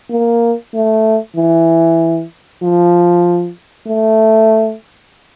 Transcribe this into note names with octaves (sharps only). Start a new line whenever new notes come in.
A#3
A3
E3
F3
A3